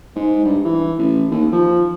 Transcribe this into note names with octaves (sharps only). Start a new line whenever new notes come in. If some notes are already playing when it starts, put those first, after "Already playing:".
G#2
G2
E3
A1
D#2
F3